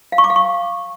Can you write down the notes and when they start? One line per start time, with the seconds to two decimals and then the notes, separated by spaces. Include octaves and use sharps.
0.12 F5
0.18 C#6
0.24 D6
0.30 F5
0.36 C#6